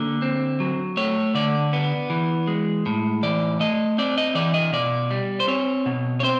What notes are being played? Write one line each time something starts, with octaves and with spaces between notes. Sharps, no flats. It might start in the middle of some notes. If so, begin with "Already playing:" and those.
Already playing: D3 A#3
C4
F#3
A3 C#5
D3 D5
B3
E3
G#3
A2
E3 D5
A3 D#5
C4 D5
D#5
E3 D5
D#5
B2 D5
G3
C5
C4 C#5
B2
C#5
C4 C5